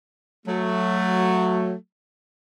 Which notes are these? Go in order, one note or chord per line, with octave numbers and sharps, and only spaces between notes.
F#3 A3